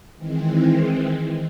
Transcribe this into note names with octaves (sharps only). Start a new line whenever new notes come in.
D#3 E3 G#3 C4